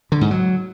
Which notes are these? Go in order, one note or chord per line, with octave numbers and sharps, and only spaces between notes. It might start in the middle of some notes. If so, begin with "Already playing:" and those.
D3
G#2
F#3